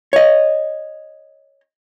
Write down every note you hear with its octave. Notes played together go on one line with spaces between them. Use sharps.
C#5 D#5